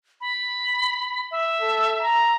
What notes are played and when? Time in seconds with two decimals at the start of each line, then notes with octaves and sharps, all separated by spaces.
0.21 B5
1.31 E5
1.61 A4
2.02 A#5